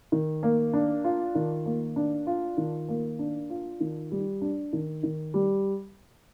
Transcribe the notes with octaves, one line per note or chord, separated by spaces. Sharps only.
D#3
A#3
D4
F4
D#3
A#3
D4
F4
D#3
A#3
D4
F4
D#3
G3
D4
D#3
D#3
G3